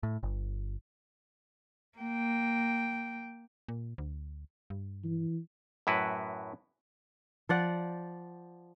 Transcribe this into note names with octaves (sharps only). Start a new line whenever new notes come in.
A2
G1
A#3 G5
A#2
D2
G2
E3
F#2 A2 E4 F#4 B4
F3 D5 F#5